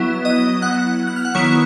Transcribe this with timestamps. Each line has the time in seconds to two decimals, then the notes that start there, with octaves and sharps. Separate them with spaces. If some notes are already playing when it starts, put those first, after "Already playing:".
Already playing: F#3 B3 E4
0.25 D#5 D#6
0.62 F#5 F#6
1.07 F#6
1.16 F6
1.24 F#5 F#6
1.35 D#3 F#3 B3 E4 C#5 C#6